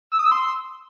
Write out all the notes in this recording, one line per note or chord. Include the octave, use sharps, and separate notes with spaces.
E6
D#6
E6
C6